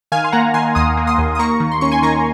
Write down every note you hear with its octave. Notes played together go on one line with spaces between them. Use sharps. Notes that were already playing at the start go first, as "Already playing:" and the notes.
D#3 F5 G#5
C6
A#3 F#5 A#5
D#3 G#5 C6
D#2 C6 D#6
A#3
C6 D#6
D#2
D#6
A#3 A#5 C#6
D#3
C6
C#4 C#6
G#5 C6
D#3 A#5 C#6